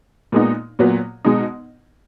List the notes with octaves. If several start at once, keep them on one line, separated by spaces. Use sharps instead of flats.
A#2 G#3 B3 D#4
A#2 F#3 B3
B2 G#3 D#4